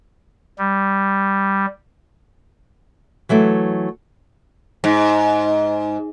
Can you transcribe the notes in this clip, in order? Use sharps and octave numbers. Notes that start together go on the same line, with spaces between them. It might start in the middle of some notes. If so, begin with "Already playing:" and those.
G3
E3 F#3 A3 E4
G#2